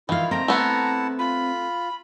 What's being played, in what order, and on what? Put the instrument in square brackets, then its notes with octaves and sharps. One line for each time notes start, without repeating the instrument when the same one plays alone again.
[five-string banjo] D#3 [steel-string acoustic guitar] E3 F5 [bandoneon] E4 F4
[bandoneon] A3 A#3 [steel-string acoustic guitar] C4 [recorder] A#5
[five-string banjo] A3 B3 [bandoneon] E4 F#5 A5
[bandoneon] F4 [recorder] B5